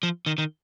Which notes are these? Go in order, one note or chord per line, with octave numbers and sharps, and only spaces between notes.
F3
D#3
D#3